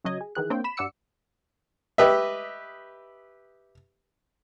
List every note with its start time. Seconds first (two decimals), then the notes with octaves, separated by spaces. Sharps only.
0.04 C#3 F#3 D#5 G#6
0.21 G#4
0.35 D#3 E3 G#4 F#6
0.50 A#3 C4 D4 A#4 C#5 G5
0.64 B5 E7
0.77 G2 D5 F#5 D6 E6 C#7
1.98 G4 B4 D#5 E5